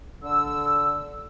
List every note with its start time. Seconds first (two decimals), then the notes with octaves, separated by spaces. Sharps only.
0.23 D3 E6